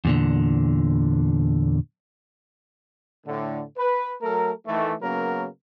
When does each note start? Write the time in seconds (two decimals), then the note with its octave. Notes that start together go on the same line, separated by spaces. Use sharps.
0.05 E2 A#2 D3
3.27 A2 D3
3.77 B4
4.22 F#3 A3 A4 A#4
4.67 D#3 E3 A3
5.01 C#3 F#3 A#3 B3 C#4 A#4